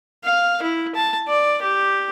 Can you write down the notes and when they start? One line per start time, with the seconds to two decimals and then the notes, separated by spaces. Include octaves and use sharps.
0.24 F5
0.62 E4
0.95 A5
1.28 D5
1.62 G4